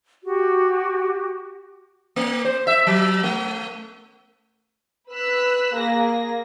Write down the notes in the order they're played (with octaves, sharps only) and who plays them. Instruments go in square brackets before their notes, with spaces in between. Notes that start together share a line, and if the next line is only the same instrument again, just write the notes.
[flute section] F#4 G4
[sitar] A#3
C5
E5
F#3
A3
[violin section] B4 E6 F#6 B6
A#3 G#4 A#6